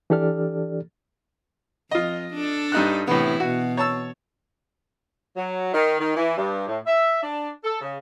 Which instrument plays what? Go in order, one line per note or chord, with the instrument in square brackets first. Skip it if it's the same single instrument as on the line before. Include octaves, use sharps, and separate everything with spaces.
[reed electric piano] E3 D4 G4 A4 D5 F6
[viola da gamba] F2 [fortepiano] F4 D#5
[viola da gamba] D4 A4
[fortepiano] G2 D#4 F#6
[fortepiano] A2 B3 [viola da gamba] C3 E3 E4
[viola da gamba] B2 [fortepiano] F#4
[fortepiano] C#5 A5 E6
[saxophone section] F#3
D#3
D#3
E3
G2
A2
E5
D4
A4
C#3